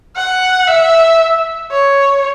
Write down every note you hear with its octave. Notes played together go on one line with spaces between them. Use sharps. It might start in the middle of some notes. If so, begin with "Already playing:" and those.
F#5
E5
C#5